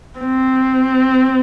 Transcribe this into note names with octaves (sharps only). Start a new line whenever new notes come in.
C4